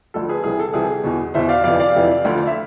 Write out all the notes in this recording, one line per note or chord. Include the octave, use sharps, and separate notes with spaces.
D2 D3 F3 A4
G#4 B4
C2 C3 E3 G#4
A4
C2 C3 E3 G#4
E2 B2
E2 B2 C5 E5
D5 F5
F2 C3 E3 D5 F5
D5 F5
F2 C3 E3
D2 D3 F3
E5